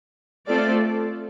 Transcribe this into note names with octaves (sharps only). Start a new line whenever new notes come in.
A3 C4 F4 A4 D5